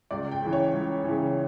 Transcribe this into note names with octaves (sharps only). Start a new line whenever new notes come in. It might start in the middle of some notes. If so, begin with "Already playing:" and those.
C#2 D5
G5
C#3 E3
C#5
C#2
E3
C#3